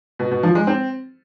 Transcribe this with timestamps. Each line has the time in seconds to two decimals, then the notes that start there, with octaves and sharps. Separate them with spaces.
0.19 B2
0.31 B2
0.43 F3
0.55 G#3
0.67 C4